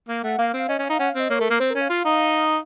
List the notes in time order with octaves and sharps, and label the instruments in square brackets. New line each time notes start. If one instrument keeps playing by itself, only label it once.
[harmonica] A#3
[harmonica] A3 [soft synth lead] F#5
[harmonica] A#3 [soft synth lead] F5
[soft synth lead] F5
[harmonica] C4
[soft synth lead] F5
[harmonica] C#4 [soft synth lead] D#5
[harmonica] C#4
[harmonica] D#4 [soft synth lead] F5
[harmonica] C#4 [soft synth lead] F#5
[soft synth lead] F5
[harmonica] C4
[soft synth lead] D#5
[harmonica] A#3 [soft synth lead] C#5
[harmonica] A3 [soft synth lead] A#4
[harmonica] A#3 [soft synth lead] A#4
[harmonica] C4 [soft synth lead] C5
[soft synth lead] A#4
[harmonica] C#4
[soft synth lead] F5
[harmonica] F4
D#4